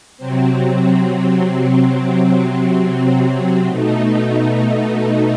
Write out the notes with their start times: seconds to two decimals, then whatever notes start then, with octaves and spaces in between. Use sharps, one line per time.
0.18 C3 F#3 C4
3.66 B2 A3 D#4